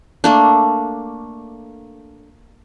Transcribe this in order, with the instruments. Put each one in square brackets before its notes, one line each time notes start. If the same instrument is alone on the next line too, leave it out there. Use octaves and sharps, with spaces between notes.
[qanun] A3 A#3 D4